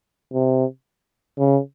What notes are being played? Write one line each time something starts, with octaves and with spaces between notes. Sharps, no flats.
C3
C#3